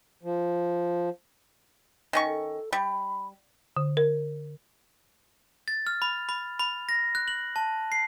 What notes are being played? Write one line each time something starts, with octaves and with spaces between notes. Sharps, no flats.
F3
D#3 C#4 C#6
A4
G3 B5
D3
A#4
A6
F6
B5
B5
B5
A#6
F#6
F#7
A5
C7